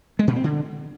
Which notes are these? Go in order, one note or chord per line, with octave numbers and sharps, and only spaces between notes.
G#3
A#2
C4
D3